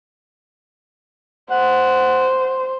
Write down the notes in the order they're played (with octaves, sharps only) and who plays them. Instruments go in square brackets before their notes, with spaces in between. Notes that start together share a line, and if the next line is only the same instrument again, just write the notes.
[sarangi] C5 [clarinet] F#5